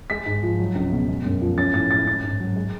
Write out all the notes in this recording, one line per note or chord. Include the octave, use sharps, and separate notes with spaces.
G#3 B6
G#2
F3
F#3
C#2
B2
G#3
F#2
F3
C#4 A6
A2 A6
G#3 A6
C#4 A6
G#2
F#3
G#3